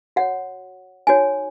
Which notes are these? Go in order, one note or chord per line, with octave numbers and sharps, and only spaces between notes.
F#4 C#5 F#5
D#4 F#4 C#5 G#5